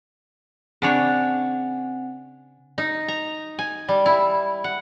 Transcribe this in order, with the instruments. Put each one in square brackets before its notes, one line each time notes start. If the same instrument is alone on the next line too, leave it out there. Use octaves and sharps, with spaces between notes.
[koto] C#3 D4 C#5 [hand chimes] C4 F#5 G#5
[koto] D#4
A#5
G#5
G3
E4
F#5